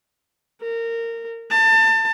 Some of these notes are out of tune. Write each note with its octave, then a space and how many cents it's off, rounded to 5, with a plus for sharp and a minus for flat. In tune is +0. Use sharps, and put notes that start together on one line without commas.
A#4 -20
A5 +30